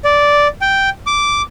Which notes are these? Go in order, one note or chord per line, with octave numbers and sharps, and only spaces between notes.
D5
G5
D6